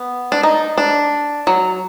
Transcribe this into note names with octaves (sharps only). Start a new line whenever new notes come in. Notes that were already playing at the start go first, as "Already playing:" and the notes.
Already playing: B3
D4
D#4
D4
F#3